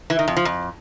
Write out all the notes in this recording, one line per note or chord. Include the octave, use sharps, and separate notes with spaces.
E3
D#3
F2
F3
F2